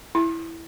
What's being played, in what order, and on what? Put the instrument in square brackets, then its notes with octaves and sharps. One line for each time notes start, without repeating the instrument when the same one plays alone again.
[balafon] E4